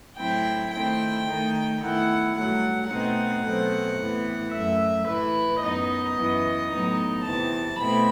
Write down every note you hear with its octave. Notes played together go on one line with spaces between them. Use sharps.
A2 F#3 C4 E4 G5
D#3 A3 C4 E4 G5
D#3 A3 D#4
E2 D#3 A3 E4 F#5
G2 F#3 A3 F#5
B2 A3 C4 D#4 F#5
B2 F#3 A3 C4
A2 E3 B3
F#2 F#3 A3 E5
A2 E3 A3 E4 B4
F#2 F#3 B3 D#4 D#5
F#2 E3 B3
A2 F#3 B3 D#4
E2 C3 E3 A5
B2 A3 C4 E4 B5